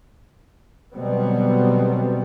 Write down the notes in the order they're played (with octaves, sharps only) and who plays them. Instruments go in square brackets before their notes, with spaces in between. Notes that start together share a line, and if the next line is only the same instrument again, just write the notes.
[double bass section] B2 D3 F#3 G3 B3 C4